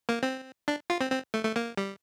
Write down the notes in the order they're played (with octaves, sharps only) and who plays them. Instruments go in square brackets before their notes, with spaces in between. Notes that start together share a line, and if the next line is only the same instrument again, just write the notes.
[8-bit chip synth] A#3
C4
D4
F4
C4
C4
A3
A3
A#3
G3